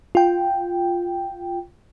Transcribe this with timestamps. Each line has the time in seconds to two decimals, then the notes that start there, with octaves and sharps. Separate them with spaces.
0.15 F4 G5